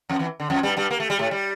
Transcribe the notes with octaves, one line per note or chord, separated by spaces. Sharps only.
F2 F3
E2 E3
D3
F2 F3
G2 G3
G2 G3
A#3
A3
G3
A2 A3
G3